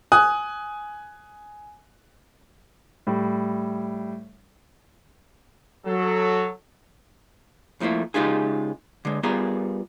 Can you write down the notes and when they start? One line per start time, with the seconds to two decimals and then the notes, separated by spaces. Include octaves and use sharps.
0.12 G#5 D#6 F#6
3.07 A2 G3
5.86 F#3 A4
7.80 F2 F3 A3 A#3 E4
8.14 C#3 G#3 D#4 F4 G4 G#4
9.05 D3 G#3
9.23 G3 B3 F4 G#4 A#4